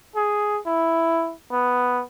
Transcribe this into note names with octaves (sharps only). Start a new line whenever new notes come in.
G#4
E4
B3